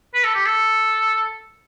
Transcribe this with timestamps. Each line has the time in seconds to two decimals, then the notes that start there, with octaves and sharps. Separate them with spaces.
0.14 B4
0.24 A4
0.35 G4
0.45 A4